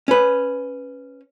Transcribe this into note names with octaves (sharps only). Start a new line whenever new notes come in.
C#4 B4